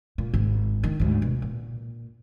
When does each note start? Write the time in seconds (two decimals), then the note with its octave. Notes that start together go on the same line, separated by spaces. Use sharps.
0.18 A#2
0.34 G#1 G#2
0.84 D#3
1.00 D2 G#2
1.22 B2
1.42 A#2